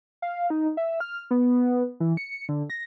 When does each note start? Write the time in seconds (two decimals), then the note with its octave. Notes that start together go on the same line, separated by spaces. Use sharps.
0.22 F5
0.50 D#4
0.77 E5
1.00 F6
1.31 B3
2.00 E3
2.17 C#7
2.49 D3
2.70 A#6